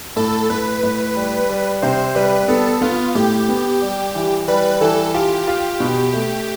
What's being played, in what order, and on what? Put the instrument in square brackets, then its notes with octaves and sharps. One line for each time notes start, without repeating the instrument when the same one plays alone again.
[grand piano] A2 [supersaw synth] A4
[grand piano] A2 [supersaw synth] B4
[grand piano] A2
G3
G3
[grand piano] C3 [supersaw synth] C5
[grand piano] G3 [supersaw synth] B4
[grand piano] B3 [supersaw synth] A4
[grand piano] B3 [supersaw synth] F4
[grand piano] A2 [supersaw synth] G4
[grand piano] B3
G3
E3
[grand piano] G3 [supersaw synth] B4
[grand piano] E3 [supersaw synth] A4
[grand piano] F4 [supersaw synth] G4
[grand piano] F4
B2
A3